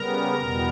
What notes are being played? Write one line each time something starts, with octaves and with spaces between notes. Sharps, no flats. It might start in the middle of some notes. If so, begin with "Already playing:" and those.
Already playing: C#3 G3 B3 A#4 A#5
E2 B2 G3 B3